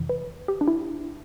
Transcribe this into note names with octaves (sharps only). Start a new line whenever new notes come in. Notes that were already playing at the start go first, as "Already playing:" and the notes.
Already playing: F2 C3 E3
B4
G4
D4
E4